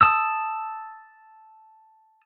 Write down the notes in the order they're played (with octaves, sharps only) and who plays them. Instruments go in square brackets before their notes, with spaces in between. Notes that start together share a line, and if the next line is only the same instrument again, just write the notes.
[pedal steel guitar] A5 D#6 E6